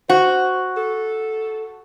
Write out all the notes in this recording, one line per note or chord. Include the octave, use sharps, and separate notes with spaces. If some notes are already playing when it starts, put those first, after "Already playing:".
F#4 C5
A4